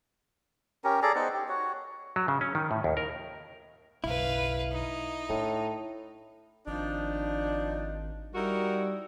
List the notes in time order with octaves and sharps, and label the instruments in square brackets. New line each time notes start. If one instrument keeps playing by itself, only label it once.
[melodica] C#4 G4 A#4
G#4 A4 D5 A#5
B3 D#4 C5 F#5
G4
F#4 C#5
[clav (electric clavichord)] F#3
C#3
C#4
D#3
A2
D#2
A#4
[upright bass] F#1 B1 [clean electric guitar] E4 [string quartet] B4 F5
[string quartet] D#4
[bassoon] A2 [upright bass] D4
[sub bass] G#1 [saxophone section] F3 D4 [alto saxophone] D#4
[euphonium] G3 [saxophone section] D#4 E4 A#4 [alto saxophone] F#4